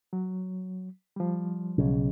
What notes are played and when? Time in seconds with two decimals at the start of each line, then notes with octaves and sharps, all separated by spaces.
0.13 F#3
1.16 F3 G3
1.78 B1 C#3